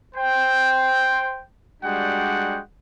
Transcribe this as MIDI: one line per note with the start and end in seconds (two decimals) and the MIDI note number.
0.16 1.43 72
0.16 1.43 79
1.83 2.59 55
1.83 2.59 56
1.83 2.59 62
1.83 2.59 66
1.83 2.59 78
1.83 2.59 79